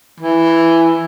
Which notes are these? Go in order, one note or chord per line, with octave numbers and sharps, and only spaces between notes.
E3